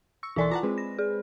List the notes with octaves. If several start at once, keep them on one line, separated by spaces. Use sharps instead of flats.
C#6 E6
B1 E3 E4 A4 D5 C6
F4 F#5 A5 A#5
G#3 C4 B4
A#6
G#4